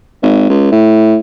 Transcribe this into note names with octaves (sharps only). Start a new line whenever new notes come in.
G#1
C#2
A2